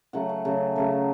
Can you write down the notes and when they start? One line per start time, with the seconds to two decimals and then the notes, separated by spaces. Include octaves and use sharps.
0.13 C#3 F#3 A3 F#5
0.29 F#5
0.45 C#3 F#3 A3
0.76 C#3 F#3 A3